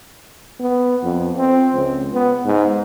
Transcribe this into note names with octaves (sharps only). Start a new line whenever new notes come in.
B3
F2
C4
C#2
B3
G#2